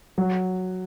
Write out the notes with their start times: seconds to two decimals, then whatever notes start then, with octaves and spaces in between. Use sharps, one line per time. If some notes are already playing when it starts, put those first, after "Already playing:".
0.18 F#3